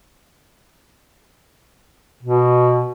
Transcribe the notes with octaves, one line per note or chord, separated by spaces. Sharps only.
B2